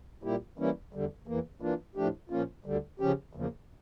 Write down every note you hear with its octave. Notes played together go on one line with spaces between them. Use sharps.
A#2 G3 A#3 E4 G4
E3 G3 A#3 C#4 E4
E2 D3 G3
E2 E3 A#3
E3 A#3 D4 F4
A2 F3 A3 D4 G4
A#2 F3 A#3 C#4 F4
D2 D3 G3
C#3 F3 C#4 G4
E2 C#3 F3 A#3